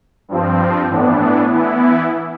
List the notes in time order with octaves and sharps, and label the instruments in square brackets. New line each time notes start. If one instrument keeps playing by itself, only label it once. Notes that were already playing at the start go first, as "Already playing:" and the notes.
[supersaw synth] G2 F3 C4
A2 E3 B3 D4
E3 B3 E4